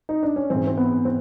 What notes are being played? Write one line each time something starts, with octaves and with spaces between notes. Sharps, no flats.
D#4
D4
C#4
G#2 E3 C4
C4
B3
C4